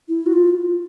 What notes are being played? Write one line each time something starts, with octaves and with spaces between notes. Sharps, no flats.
E4
F#4
F4